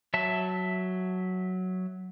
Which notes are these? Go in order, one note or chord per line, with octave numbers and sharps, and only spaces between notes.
F#3 E5 A5